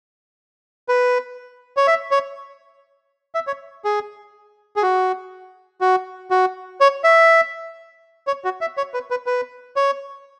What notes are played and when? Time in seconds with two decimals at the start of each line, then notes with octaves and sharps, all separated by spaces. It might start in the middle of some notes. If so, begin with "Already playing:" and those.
0.89 B4
1.77 C#5
1.87 E5
2.11 C#5
3.35 E5
3.47 C#5
3.85 G#4
4.76 G#4
4.83 F#4
5.81 F#4
6.31 F#4
6.81 C#5
7.04 E5
8.27 C#5
8.45 F#4
8.61 E5
8.77 C#5
8.94 B4
9.11 B4
9.26 B4
9.76 C#5